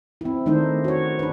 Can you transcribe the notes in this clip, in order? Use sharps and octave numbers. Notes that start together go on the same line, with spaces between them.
C4 E4
D#3 A3 D4 D#4 C5
F#4 C#5
D4 B4